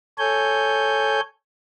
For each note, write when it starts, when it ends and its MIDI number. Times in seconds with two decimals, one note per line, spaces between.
0.18 1.20 69
0.18 1.20 73
0.18 1.20 80
0.18 1.20 91